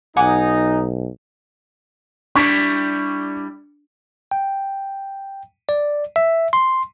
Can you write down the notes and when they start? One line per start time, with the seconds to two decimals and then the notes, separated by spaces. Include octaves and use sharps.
0.17 B1 D#4 F#5 G#5 D6
2.35 G3 D4 E4 G4 C#6
4.31 G5
5.69 D5
6.16 E5
6.53 C6